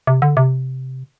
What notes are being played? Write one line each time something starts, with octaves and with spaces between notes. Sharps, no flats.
C3
D3
C3